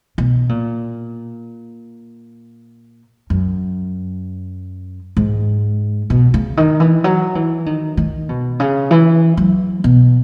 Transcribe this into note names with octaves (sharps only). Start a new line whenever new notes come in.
B2
A#2
F#2
G#2
B2
C#3
D#3
E3
F#3
E3
D#3
D#3
B2
C#3
E3
F#3
B2